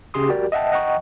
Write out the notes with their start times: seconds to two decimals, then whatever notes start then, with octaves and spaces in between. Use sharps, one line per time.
0.14 C#3 G4 G#4 C6 D#6
0.29 F#4 G4 A#4 D5
0.52 D#5 E5 F#5 G5 A5
0.72 D#5 F#5 G5 A#5 C#6